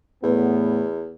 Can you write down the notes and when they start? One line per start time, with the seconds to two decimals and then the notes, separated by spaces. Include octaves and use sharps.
0.23 E2 A2 B3